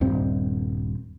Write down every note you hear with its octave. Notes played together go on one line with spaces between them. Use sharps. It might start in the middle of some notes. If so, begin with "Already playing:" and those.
D#1 G2 C4